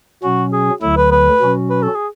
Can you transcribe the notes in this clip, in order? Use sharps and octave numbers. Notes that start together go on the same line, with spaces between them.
B2 F#3 C#4 F#4
G#4
D2 D3 F#3 E4
B4
B4
B2 F#3 C#4 F#4
B4
A4
G#4